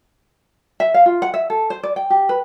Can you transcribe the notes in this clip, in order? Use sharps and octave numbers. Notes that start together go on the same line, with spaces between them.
E5
F5
F4
F#5
E5
A4
C5
D5
G5
G4
B4